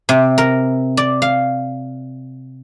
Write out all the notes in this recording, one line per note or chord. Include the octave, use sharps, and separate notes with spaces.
C3
A#4
D5
F5